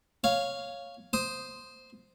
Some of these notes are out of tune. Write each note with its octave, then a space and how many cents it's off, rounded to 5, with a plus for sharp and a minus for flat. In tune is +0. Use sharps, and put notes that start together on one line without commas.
C#5 +0 F5 +0
C5 -5 D#6 +0